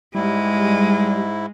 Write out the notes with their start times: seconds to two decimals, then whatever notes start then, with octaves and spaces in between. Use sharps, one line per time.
0.15 G#2 G3 G#3 E4